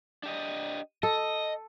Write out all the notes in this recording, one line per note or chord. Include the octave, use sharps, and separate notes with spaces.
D4 G4 D#5
A4 D#5